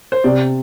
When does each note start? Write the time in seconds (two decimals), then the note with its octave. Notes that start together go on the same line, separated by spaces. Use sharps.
0.12 C5
0.24 C3 D5